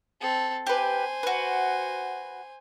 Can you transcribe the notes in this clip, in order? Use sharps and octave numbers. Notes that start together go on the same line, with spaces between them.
C4 A4
G4 B4 C5 G#5
F#4 B4